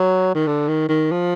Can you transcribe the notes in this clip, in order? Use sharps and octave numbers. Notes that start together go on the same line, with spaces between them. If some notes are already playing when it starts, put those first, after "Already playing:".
Already playing: F#3
D#3
D3
D#3
D#3
F3